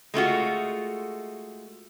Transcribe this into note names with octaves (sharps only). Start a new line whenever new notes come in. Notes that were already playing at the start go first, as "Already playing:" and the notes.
G#3 A3 F4 F#4